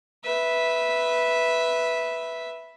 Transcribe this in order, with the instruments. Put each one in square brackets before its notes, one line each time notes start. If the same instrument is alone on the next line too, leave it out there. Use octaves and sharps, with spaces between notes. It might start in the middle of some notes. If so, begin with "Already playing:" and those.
[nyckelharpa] B4 E5